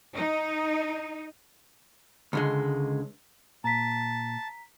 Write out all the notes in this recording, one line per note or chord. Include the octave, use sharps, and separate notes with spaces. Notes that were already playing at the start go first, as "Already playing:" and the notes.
D#4
C#2 D3 G#3
A#2 A5 A#5 B6